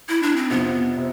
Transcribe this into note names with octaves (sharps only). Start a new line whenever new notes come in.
E4
D4
C4
F2 C3 F3 B3
C3